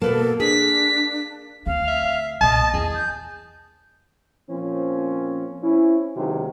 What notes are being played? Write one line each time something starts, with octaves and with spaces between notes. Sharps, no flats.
B2 A#3 A4 B4 A5
D4 G#4 B6
D2 C4 F5
E5
B1 A#2 D#5 A5
E2 G#4
G6
A#2 F3 C4 C#4
C4 C#4 E4
C#2 C3 D#3 F#3 A#3